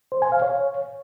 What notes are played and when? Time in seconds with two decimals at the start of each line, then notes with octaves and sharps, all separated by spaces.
0.12 C5
0.22 G#5
0.32 F5
0.42 C#5